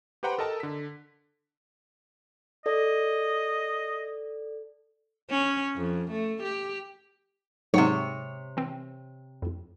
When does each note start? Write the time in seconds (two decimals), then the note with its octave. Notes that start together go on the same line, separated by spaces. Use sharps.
0.23 G4 B4 C5 F#5 G5 A#5
0.39 A4 A#4 D#5 A5
0.60 D3 B6
2.66 A4 D5 D#5
5.29 C#4
5.76 F2
6.12 A3
6.43 G4
7.74 G#2 C3 F#3 C#5 F#5
8.57 E3 C4
9.42 F2